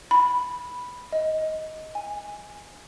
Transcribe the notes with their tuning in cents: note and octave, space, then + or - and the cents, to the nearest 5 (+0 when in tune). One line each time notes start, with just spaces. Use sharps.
B5 -5
D#5 +15
G#5 -5